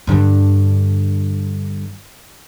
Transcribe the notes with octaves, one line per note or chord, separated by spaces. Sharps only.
G2 D3